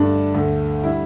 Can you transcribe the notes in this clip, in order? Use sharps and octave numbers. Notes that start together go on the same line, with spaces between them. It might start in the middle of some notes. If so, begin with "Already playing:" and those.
Already playing: G2 D3 A3 D4
D2 D3 A3
D3 G3 E4